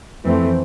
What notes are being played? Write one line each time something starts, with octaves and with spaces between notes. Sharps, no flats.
F2 E3 A3 C4